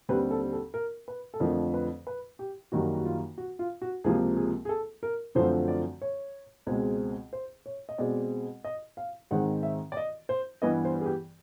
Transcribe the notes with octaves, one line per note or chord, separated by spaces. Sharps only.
D#2 D3 G3 C4 B4
A4
A4
A#4
B4
A4
F2 D3 F3 A3 A#4
B4
B4
G4
F#2 D#3 G3 A#3 F#4
F#4
F4
F#4
F4
F#4
C#2 C3 F3 A#3 G#4
G#4
G#4
A4
A#4
F#2 D3 F3 A3 C4 C5
D5
C#5
C#2 B2 G#3 C4
C5
C#5
D#5
B2 G#3 C4 D5
D#5
F5
G#2 D#3 G#3 C4 F#5
E5
D5
D#5
C5
G2 E3 G3 B3 D#5
C5
G#4
G4